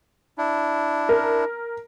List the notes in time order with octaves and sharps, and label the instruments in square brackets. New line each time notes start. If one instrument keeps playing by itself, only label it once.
[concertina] D4 E4
[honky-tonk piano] A#4